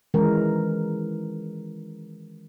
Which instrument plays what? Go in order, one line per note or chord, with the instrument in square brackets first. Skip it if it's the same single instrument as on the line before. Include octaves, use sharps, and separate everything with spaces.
[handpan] D#3 E3 G#3 C#4 A#4